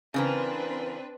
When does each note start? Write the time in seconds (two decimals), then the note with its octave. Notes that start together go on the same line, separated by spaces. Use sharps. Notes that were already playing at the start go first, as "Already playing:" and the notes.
0.14 C#3 E3 C4 D4 A#4 B4